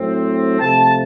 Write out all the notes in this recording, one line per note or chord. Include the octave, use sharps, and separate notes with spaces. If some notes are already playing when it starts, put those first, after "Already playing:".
Already playing: A2 F#3 A3 C4
C3 F3 A3 A5